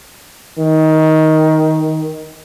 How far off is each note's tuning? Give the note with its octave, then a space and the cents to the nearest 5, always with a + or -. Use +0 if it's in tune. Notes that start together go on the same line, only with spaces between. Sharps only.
D#3 +15